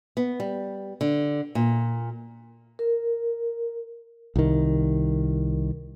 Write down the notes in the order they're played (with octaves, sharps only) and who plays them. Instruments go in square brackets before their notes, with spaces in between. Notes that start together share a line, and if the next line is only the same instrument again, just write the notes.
[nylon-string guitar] B3
G3
D3
A#2
[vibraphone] A#4
[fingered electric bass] C2 D#3